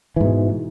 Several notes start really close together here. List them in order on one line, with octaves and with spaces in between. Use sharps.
E3 G#2 B2